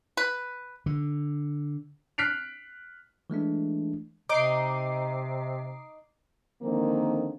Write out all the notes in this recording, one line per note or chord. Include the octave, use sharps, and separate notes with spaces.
B4
D3
F6 F#6 B6 C7 D7 F7
E3 G#3 A3 D4
C3 D#4 D6 C7
D3 D#3 F3 A#3 C4